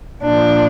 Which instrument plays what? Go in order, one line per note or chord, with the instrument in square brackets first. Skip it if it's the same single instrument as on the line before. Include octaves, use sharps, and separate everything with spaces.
[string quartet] A#2 F3 D4